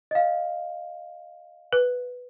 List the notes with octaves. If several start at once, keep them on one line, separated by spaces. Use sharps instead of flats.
D#5 F5
B4